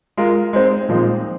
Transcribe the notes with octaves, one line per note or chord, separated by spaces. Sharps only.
G#3 F4 A#4
G#3 C4 D#4 C5
A#2 F3 G#3 C4 D#4